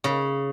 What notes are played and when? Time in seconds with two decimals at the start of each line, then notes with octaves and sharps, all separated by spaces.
0.04 C#3